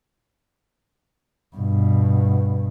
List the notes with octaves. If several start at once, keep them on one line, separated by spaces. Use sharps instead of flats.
G2 B2